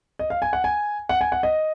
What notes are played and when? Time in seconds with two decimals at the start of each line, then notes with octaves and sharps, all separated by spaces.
0.19 D#5
0.30 F5
0.42 G#5
0.53 F#5
0.64 G#5
1.09 F#5
1.21 G#5
1.32 F#5
1.43 D#5